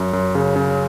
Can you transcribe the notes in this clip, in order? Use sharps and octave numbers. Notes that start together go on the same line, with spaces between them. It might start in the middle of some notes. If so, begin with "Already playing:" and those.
Already playing: F#2
F#2
C#3
C#3